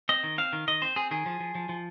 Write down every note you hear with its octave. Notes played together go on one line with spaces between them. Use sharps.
C4 D#5
D#3
C4 F5
D#3
D#3 D#5
C4 C5
C4 G#4
D#3 G#4
F3
F3
F3
F3